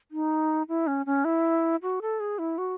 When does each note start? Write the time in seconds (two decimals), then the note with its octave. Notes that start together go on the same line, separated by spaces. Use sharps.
0.11 D#4
0.68 E4
0.87 C#4
1.06 C#4
1.25 E4
1.82 F#4
2.02 A4
2.20 G#4
2.39 E4
2.58 F#4